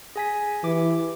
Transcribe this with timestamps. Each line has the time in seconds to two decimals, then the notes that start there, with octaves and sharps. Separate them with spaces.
0.16 G#4 G#5 B6
0.64 E3 G4 D6